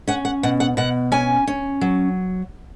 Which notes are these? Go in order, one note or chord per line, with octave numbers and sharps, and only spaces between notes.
C#4 F#5
F#5
B2 F#5
F#5
B2 F#5
C#4 G#5
C#4
F#3